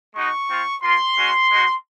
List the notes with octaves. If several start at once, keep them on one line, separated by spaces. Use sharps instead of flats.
G#3 D#4 F#4 C#6
C4 F4
A#3 F4 C6
G#3 C#4 F#4
G#3 D#4 F#4